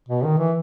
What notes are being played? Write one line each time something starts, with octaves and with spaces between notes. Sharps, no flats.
B2
D#3
E3